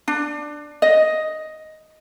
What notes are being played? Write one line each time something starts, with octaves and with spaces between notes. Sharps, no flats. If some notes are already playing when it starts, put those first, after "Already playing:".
D4
D#5